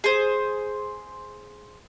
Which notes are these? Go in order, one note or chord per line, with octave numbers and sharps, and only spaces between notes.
G#4 C5